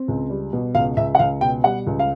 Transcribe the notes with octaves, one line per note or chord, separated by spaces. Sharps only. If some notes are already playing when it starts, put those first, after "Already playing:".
Already playing: C4
C#2
G3
B2
C#2 F5
C#2 E5
F#5
C#2 F5
B2 G5
G3 F#5
C#2
F5